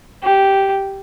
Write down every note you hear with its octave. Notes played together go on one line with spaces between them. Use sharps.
G4